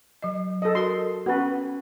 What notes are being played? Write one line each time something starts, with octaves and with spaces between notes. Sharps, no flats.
F#3 D#5
A4 D#5
F#4 A#4 C6
B3 C#4 F#4 B4